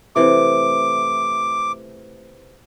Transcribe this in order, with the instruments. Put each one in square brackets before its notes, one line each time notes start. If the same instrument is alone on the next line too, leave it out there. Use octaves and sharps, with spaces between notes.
[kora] C3 E3 A3 [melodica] D6